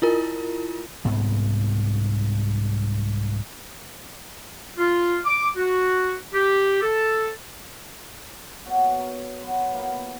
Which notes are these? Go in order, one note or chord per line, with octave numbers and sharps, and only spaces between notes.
E4 F4 A#4
C2 G#2 B3
F4
D6
F#4
G4
A4
B2 C#5 F#5
A#4
F#3 B4 C6
A#3 B3 E4 A#4